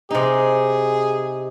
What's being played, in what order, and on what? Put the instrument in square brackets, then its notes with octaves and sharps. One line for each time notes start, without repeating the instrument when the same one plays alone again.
[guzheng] C3 D#4 [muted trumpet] G#4